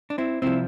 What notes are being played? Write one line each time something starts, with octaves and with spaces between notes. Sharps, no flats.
D4
C4 E4
C2 C3 F3 C4 E4